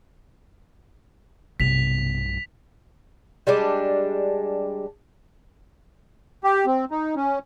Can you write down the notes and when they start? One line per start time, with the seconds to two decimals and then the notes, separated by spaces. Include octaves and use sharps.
1.60 B1 G2 C3 B3 B6 F7
3.47 G3 G#3 D4
6.44 G4
6.66 C4
6.91 D#4
7.16 C#4